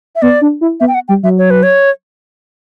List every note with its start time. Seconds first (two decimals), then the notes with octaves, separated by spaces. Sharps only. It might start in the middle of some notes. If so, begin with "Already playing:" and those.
0.16 E5
0.22 B3 D5
0.41 D4
0.61 E4
0.80 B3 E5
0.88 G5
0.94 F#5
1.08 G3 G5
1.23 F#3 E5
1.38 C#5
1.50 B4
1.63 C#5